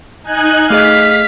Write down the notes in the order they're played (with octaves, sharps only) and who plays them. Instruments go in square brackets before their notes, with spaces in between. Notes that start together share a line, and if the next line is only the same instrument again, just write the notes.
[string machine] D#4 G#5 F#6
[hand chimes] A3 G#4 D#5 [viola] F5 [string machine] B6